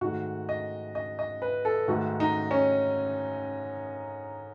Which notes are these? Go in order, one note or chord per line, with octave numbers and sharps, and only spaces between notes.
G#2 D#3 A3 F#4
D#5
D#5
D#5
B4
A4
G#2 D#3 A3 F#4
D#4
C#4